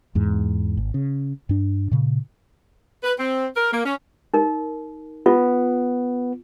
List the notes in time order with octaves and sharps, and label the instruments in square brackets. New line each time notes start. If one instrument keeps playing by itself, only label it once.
[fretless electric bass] E2 G#2
G#1
C#3
G2 D4
A#2 C#3
[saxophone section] B4
C4
A#4
A#3
C#4
[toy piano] D#4 A#4
[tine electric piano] B3 [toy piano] F4